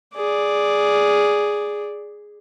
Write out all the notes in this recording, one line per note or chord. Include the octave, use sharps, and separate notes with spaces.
G#4 D5